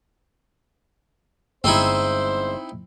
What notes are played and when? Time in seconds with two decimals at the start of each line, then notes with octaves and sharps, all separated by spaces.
1.64 G1 G#3 C4 D#4 E4 C5